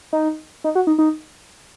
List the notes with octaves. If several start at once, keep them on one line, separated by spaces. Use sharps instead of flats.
D#4
D#4
F#4
D#4
D#4